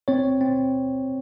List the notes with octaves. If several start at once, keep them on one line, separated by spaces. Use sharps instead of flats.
C4 C#5
C4